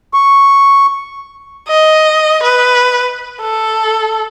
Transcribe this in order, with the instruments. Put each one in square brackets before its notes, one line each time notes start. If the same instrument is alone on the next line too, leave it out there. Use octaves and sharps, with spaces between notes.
[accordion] C#6
[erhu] D#5
B4
A4